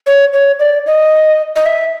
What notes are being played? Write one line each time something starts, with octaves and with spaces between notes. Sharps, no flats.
C#5
C#5
D5
D#5
D#5
E5